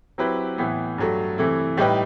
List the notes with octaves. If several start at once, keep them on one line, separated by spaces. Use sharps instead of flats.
F#3 C4 E4 G4 B4
A2 E3 B3
G2 F#3 A3
C3 E3 A3 E4
A2 G3 D#4 G4 B4